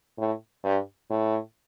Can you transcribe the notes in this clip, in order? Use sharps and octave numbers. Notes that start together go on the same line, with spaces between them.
A2
G2
A2